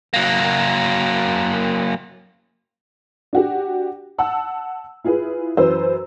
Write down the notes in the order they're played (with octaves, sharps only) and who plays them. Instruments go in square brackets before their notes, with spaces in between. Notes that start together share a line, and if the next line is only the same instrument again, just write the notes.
[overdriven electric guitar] F#3 A#3
[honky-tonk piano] D4 F#4 G4
F#5 A5 E6
E4 F4 G#4 B4
F#2 E3 B4 C5 E6